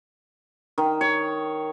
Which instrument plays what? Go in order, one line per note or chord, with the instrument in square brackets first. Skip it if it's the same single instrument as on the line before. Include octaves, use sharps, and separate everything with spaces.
[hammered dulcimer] D#3
C#5